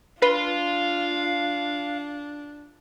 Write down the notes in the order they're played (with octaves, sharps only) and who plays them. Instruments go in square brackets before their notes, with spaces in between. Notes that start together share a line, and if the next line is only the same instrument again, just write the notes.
[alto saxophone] D4 [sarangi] F4 [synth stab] B4 [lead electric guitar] F5 C6